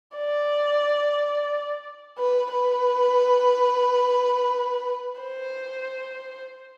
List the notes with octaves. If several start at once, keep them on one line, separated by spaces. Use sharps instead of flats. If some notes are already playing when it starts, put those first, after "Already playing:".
D5
B4
B4
C5